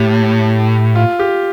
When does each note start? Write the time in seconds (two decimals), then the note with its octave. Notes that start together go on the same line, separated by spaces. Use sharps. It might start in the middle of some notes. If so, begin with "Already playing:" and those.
Already playing: A2 G4
0.95 F4
1.19 G4